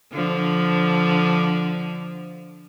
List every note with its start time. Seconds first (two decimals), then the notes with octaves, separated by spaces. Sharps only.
0.13 D3 F3